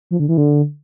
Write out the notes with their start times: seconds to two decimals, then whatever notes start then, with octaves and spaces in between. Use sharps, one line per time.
0.11 F3
0.20 D3
0.29 E3
0.37 D3